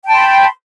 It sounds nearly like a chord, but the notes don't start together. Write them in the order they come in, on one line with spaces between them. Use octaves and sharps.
G5 A5 C6 B5